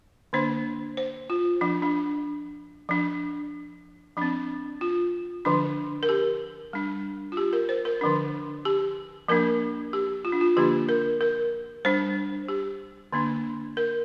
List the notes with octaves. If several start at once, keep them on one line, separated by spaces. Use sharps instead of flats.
D3 A#3 D4 C5
C5
F4
F3 D4
D4
F3 D4
F3 C4 D4
F4
D3 F3 D4
A#4
G4
G3 D4
F4
G4
A#4
C5
A#4
D3 F3 D4
G4
F3 A#3 D4 A#4
G4
F4
D4
F4
D3 F3 A#3 D4 G4
A#4
A#4
G3 D4 C5
G4
D3 A#3 D4
A#4